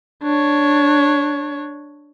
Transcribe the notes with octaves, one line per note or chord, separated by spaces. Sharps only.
D4 C#5